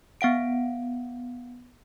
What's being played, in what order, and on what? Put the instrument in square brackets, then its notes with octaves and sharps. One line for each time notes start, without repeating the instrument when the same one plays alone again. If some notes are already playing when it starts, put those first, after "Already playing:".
[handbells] B3 F5 F#5 D7